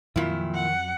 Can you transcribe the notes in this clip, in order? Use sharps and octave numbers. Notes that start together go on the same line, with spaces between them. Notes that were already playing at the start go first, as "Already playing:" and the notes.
F2 A#2 D#3 F3 F#3 E4
F#5